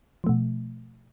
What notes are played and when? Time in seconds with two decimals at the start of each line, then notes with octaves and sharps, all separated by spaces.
0.24 F3
0.27 A3
0.29 B2